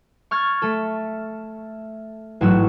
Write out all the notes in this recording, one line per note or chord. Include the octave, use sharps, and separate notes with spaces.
C#6 F6 G#6 A6
A3 A4
A1 G#2 F#3 F#4 E6